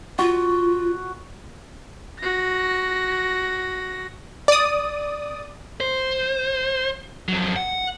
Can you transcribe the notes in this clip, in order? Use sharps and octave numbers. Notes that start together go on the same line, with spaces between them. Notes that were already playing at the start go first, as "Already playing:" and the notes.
F4 F#4
F#4 A#6
D5 D#6
C5
F2 F#3
F#5